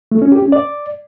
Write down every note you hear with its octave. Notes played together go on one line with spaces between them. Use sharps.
A3
C#4
G4
C#4
D5